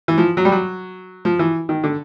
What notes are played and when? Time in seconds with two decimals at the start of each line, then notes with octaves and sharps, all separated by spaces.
0.08 E3
0.18 F3
0.37 F#3
0.45 G3
0.52 F#3
1.25 F3
1.39 E3
1.69 D#3
1.84 D3